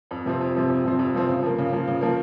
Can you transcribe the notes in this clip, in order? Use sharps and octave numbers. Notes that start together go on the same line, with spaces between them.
F2
C3 F3 C4
F2
C3 F3 C4
F2
C3 F3 C4
F2
C3 F3 C4
C#3
F3 A#3
C#3
F3 A#3
C#3
F3 A#3